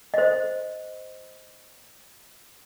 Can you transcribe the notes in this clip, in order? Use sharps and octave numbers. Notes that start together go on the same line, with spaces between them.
C5 D#5